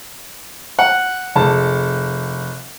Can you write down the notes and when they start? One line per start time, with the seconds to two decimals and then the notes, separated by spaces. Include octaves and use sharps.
0.79 F#5
1.35 F1 G#3 A5